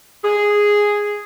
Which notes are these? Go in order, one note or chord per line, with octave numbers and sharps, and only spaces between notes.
G#4